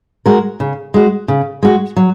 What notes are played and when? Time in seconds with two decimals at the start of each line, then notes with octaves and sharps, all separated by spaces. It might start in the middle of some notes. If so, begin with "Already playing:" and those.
0.26 G#3 F#4 A#4
0.60 C#3
0.94 G#3 F#4
1.28 C#3
1.63 G#3 F#4
1.96 F#3